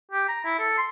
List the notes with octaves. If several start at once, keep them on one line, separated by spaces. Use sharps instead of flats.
G4
A#5
E4
A4
C6